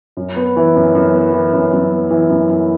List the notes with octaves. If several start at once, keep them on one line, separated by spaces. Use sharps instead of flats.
F#2
B3
E3
F#2
F#2
B3
E3
F#2
F#2
B3
E3
F#2
F#2